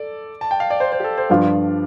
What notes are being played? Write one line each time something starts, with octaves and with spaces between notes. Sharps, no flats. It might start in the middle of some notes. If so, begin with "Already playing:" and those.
Already playing: A4 D5
A5
G5
F5
D5
C5
C5
G4
A4
C5
G2 F3 D4 F4 D5